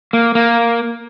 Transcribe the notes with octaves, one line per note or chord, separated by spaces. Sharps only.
A#3
A#3